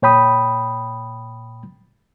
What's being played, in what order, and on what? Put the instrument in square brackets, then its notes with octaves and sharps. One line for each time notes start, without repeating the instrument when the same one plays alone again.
[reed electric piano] A#2 C#5 G5 B5 D#6